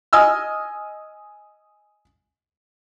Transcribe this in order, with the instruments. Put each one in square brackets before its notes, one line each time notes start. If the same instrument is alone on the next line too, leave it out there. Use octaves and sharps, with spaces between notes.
[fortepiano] D#5 G#5 E6 F6